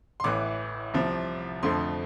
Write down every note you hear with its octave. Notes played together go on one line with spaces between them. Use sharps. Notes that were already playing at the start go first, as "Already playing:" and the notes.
C6
A1 A2 E3 D6
C2 C3 F3
F2 D3 F3 A3 C6